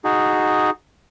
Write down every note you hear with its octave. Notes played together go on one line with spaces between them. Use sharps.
D#4 F#4 G#4